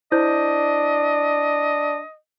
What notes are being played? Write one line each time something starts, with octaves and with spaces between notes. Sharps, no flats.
D4 E4 C5 D#5 G6